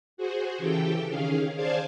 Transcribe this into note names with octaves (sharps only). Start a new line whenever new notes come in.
F#4 G#4 C5
C#3 E3 G4 A4 G5
D#3 C#4 G#4 F5
G#4 C5 D5 F5 G#5 A5